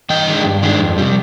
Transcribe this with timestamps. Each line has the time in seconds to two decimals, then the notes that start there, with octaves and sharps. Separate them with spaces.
0.10 G2 D#5 G5
0.27 D#3 G#3 D4
0.44 G2
0.63 D#3 G#3 D4
0.80 F2
0.98 C3 G3